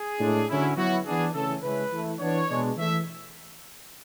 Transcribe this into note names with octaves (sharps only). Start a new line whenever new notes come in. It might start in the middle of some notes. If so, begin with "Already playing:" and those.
Already playing: G#4
A2 G#3 D4
D3 F#3 C#4 E4
F#3 B3 E4 F#4
E3 B3 D4 G#4
C#3 E3 A3 C#4 A4
C#3 G#3 C#4 E4 B4
E3 A3 E4
E3 B3 D4 C#5
B2 G#3 D4
E3 A3 E5